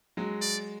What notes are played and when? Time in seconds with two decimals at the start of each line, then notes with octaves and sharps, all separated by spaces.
0.17 F#3 G#3
0.42 D5